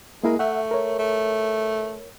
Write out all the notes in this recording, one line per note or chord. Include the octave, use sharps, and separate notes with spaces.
G#3 A#3 E4 A#4
A3 E5 F#5
A#4 C#5
A3